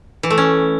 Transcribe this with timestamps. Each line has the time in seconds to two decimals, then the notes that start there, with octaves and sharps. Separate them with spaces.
0.23 E3
0.30 A3
0.38 C#4